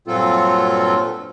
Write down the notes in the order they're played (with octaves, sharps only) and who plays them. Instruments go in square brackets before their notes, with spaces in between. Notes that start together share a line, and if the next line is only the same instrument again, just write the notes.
[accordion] G2 A#2 F#3 C4 F4 A4